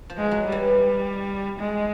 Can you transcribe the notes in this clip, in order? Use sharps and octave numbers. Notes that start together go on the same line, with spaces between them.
F3
G#3
F#3
G3
E3
G#3